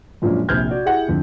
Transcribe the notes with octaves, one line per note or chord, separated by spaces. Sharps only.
F#2 A#2 F3 G#3 C#4 D4
A#1 C3 F6 G6 G#6
F#4 D5
E4 G4 G#4 F#5
F2 D3